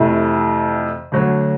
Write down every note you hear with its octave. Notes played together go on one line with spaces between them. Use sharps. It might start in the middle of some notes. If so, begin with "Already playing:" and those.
Already playing: F2 C3 E3 A3
D2 D3 F#3